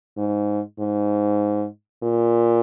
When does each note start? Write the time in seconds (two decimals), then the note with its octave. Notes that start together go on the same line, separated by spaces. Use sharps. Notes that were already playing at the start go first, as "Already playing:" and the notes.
0.17 G#2
0.79 G#2
2.03 A#2